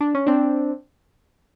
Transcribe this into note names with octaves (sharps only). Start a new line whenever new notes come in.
D4
C#4
C4 D4